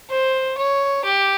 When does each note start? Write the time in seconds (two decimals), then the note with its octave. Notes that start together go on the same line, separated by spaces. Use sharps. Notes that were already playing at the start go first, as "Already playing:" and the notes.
0.10 C5
0.57 C#5
1.05 G4